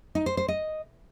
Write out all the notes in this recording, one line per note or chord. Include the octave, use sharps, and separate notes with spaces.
D#4
C5
C5
D#5